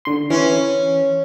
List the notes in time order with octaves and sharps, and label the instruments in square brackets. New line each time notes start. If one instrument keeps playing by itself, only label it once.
[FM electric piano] D3 C6
[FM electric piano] E3 [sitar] C#4